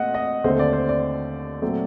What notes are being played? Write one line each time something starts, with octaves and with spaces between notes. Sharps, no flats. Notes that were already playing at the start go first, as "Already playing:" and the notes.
Already playing: A#2 A3 C4 D#5 F#5
D#5
D#2 D3 A3 C4 C5
D5
C5
D5
A#2 F#3 A3 C4